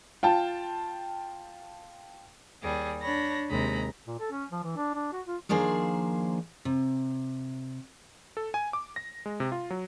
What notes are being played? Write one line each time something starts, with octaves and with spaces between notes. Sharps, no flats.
F4 G5 A5
D#2 G3 G#4
D4 C#5 B5 A#6
D#2 C3 G#3 A#5 B5
A#2
A4
C#4
F3
E3
D4
D4
F#4
F4
D#3 F3 A#3 D4 G#4 C5
C3
A4
G#5
D6
A#6
G#3
C3
F4
F#3